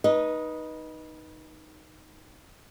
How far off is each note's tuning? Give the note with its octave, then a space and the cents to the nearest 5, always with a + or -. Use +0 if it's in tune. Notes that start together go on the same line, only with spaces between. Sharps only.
D#4 +0 B4 -25 D#5 +0